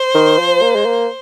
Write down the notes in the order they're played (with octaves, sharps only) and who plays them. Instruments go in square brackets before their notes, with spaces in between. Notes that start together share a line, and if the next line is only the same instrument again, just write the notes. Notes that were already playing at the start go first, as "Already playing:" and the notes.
Already playing: [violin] C5
[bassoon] D#3
F3
A#3
G#3
A#3